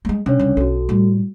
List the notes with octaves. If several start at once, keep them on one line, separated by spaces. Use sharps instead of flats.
G#3 A#3
C3 C#4 D4 C#5
C2 C#3
B1 F#4 A4
A2 G3